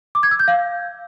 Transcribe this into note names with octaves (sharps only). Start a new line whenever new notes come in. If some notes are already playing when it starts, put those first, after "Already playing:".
D6
G#6
E6
G6
F5